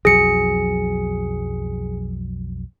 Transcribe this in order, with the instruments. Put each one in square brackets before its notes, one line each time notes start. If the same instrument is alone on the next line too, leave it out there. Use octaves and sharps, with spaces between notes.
[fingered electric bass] B1 F2 F#3 [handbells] G#4 C#7